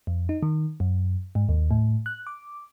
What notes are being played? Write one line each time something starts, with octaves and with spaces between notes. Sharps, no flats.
F2
D#4
D#3
F#2
G#2
D#2
A2
F#6
D6